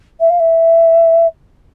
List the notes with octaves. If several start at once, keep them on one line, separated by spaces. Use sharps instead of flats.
E5
F5
E5